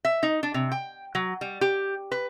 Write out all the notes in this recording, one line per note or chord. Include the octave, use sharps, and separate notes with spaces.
E5
D#4
D4
C3
G5
F#3
G3
G4
B4